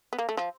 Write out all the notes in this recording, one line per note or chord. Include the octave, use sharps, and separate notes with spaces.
B3
A#3
A3
F3